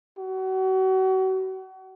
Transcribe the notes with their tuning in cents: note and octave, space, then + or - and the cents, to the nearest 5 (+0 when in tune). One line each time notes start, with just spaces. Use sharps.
F#4 +35